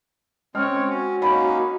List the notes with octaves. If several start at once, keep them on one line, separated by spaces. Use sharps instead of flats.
G#3 C4 C#4 C#5 F6
C#4 F#4
A#3 C#4 D#4 C#5 B5